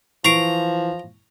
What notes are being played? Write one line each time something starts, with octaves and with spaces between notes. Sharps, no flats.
E3 F3 A#5 C#6 C7 D7